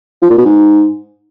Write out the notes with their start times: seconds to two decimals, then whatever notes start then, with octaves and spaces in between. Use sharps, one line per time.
0.22 F3
0.30 A#2
0.37 B2
0.45 G#2